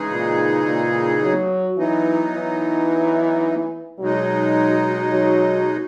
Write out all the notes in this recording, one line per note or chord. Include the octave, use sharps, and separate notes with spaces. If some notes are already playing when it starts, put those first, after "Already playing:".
Already playing: C#3 E3 G#3 D#4 G#4
A#2
A#2
F#3
E3 F#3 B3 D#4
E3
B2 F#3 G#3 D#4
F#3